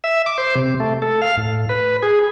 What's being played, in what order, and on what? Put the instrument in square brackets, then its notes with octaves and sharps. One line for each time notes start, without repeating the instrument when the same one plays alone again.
[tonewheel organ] E5
D6
C5
C3
A3
A4
F5
A2
B4
G#4